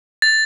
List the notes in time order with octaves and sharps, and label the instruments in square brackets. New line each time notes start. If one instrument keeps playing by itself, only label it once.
[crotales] A6